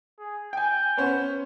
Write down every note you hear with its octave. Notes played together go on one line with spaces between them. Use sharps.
G#4
G5 G#5 G6
B3 C#4 C5